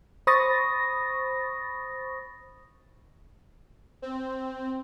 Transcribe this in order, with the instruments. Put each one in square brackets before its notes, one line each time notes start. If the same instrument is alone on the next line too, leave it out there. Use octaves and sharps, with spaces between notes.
[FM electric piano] C5 B5 C#6 D#6 A6 A#6
[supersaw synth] C4